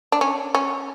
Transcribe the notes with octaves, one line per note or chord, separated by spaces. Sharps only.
D4
C#4
C#4